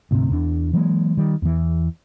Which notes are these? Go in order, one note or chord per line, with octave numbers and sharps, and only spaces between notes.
D2 G#2 C3 C4
E2 D4
E3 F#3 G#3 A#3
D#3 G3
E2 E3